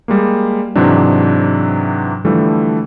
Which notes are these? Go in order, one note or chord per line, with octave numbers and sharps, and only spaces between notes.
G3 G#3 A#3
G#2 C3 E3 F#3 D4
D3 E3 F3 G3 A3